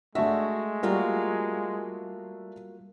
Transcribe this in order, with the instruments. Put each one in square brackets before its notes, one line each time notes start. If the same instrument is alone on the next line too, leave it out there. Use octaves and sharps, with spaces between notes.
[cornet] G#3 [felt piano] A3 D4 E5 [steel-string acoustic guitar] F#4
[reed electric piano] G3 [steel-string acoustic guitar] A#3 F4 F#4